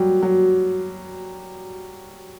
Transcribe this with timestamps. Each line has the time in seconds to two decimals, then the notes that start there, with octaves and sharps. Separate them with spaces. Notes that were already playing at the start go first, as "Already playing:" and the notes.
Already playing: F#3 G3
0.23 F#3